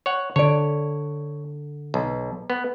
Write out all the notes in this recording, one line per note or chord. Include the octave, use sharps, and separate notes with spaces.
C#5 F#5
D3 C#5 D5
B1
B3